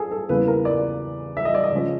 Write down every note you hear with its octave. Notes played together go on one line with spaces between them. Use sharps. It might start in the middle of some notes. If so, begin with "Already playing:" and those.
Already playing: G#4 A4
A4
E2 C#3 E3 G3 A#3 B4
A#4
D5
E5
D#5
D5
D#5
C#3 F3 G#3 C#4